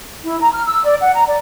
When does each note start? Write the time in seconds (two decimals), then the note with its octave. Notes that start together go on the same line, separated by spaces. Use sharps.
0.24 E4
0.41 A#5
0.53 F6
0.67 E6
0.84 D5
1.01 F#5
1.14 A#5
1.27 D5